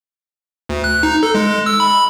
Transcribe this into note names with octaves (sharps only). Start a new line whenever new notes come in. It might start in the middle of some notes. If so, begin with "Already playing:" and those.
D2
F#6
D#4
A4
G#3
E6
B5